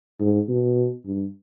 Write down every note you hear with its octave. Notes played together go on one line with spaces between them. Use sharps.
G#2
B2
G2